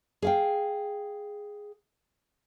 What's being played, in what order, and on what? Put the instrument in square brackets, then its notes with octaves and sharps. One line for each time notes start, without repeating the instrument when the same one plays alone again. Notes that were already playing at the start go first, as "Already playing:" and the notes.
[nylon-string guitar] G#4 F5 G5